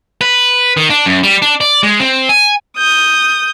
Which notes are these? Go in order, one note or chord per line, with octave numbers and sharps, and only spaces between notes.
B4
D#3
D4
F#2
G3
D4
D5
G#3
C4
G#5
D#6 G6